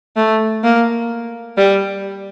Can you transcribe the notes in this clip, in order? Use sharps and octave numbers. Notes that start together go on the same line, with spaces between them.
A3
A#3
G3